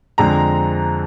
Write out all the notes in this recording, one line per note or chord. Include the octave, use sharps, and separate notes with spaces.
F2 D3 G#3 C4 A#5